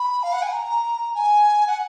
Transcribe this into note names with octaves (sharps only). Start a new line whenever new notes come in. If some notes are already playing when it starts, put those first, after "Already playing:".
Already playing: B5
F5
F#5
G#5
A#5
G#5
F#5